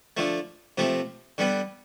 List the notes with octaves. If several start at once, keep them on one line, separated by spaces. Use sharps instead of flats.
D3 F3 A3
C3 F3 A3 C4
D3 G3 B3